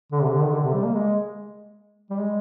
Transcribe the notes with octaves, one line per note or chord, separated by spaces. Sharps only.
D3
C3
D3
D#3
D3
C3
G3
A#3
G#3
G3
G#3